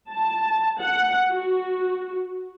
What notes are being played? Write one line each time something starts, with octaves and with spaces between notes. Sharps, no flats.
A5
F#5
F#4